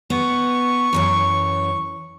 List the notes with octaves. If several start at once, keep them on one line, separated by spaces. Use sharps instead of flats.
B3 C#6
F#2 E3 C#5